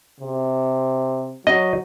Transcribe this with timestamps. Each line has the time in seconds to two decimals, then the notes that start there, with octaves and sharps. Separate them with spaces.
0.20 C3
1.47 F#3 D#5